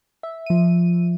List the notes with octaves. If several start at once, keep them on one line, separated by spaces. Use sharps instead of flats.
E5
F3 D#7